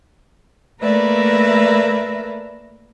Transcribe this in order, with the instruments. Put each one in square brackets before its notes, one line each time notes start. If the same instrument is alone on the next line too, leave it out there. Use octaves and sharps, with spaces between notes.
[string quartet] A3 A#3 A#4 B4 D5 E5